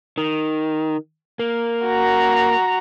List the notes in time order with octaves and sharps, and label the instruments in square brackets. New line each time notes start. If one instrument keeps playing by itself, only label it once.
[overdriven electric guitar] D#3
A#3
[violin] F#4 A#5